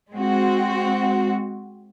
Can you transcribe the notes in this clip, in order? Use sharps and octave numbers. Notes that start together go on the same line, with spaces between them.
G#3 C4 F#4